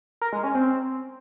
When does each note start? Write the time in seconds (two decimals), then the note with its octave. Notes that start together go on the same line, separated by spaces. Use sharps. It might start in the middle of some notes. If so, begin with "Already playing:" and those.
0.22 A#4
0.33 G#3
0.44 C#4
0.55 C4